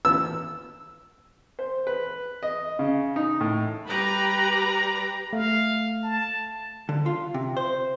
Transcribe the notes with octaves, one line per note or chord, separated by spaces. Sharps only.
E6
C5
B4
D#5
C#3
D#4
A2
G3 G4 B4 A#5 B5
A3 F5
A5
D3
F4
C3
C5